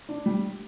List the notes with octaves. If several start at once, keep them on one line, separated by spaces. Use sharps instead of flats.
D4
G3